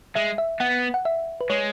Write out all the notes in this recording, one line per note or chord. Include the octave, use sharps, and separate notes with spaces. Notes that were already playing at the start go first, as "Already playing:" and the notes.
G#3 E5
E5
B3 F#5
F#5
E5
B4
G#3 C#5